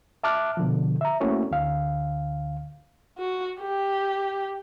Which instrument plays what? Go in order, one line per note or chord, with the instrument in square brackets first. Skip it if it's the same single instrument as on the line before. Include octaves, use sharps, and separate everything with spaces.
[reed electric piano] E5 A5 D6 F6 F#6
B2 D3 F3
E5 A#5
A3 A#3 C4 C#4 E4 F#4
D2 D3 F5
[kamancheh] F#4
G4